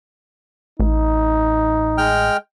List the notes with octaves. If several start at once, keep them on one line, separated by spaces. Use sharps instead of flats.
A1 D#4
G#3 G5 F6